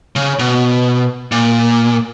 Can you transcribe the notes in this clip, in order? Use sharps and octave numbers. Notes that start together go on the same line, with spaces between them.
C#3
B2
A#2